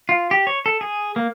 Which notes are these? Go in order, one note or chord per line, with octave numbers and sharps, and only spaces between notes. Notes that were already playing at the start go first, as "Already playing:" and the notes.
F4
G4
C#5
A4
G#4
A#3